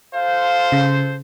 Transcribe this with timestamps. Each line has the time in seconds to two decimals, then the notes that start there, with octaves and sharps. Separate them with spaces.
0.15 F4 A4 C5 F5
0.72 C#3